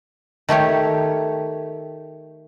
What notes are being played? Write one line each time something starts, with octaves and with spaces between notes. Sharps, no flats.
D#3 A3 G4 C#5